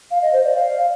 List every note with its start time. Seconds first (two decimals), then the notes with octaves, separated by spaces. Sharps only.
0.11 F5
0.22 D#5
0.33 C5
0.44 D5
0.55 F5